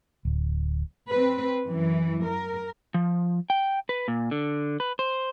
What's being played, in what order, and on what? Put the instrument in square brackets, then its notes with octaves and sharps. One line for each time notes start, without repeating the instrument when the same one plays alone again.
[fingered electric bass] D1
[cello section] C4 B4
F#2 E3
A#4
[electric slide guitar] F3
G5
B4
A#2
D3
B4
C5